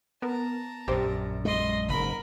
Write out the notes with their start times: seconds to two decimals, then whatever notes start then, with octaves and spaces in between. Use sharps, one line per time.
0.22 B3 A#4 A5 A#5
0.88 A#1 F#2 G4 C5
1.45 G#3 D#5 C6
1.89 F#1 G#2 A#4 B5